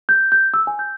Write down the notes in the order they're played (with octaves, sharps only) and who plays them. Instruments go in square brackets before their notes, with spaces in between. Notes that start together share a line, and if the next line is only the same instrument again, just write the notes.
[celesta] G6
G6
E6
G#5
G6